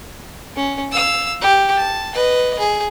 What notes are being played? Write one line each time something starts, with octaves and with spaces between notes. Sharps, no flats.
C#4
F5 E6
G4
A5
B4 D#5
G#4